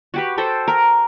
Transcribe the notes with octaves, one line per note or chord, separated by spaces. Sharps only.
F#4 G4 B4
F#4 A4 C5 G5
A#4